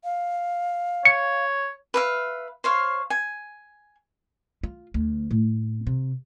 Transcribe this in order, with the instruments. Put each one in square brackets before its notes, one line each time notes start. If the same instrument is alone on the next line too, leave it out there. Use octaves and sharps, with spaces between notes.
[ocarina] F5
[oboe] C#5 [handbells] C#7
[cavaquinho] B4 E5 F5
C5 C#5 F5
G#5
[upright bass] F4
D2
A2
C3